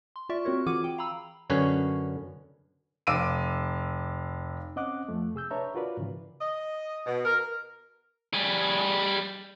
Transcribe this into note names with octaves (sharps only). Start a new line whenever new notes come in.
C6
F4 D5 E5 C#6
C4 F#4 A#4 C#5
E3 F4 G#4 F#5 D6 D#7
G5
F5 A#5 B5 E6
F#2 D3 C#4 B4 C#5
F1 F5 D6 E6 D7 D#7
C4 C#4 D#5 F#5 D6 F#6
F2 F3 A3
C3 G#4 E6 G6
D4 B4 C#5 E5 A5 A#5
F4 F#4 A#4 B4 D5
G#2 C#3 E3
D#5
B2
A#4
G3 G#4